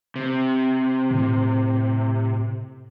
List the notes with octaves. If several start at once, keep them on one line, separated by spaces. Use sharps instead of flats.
C3
A2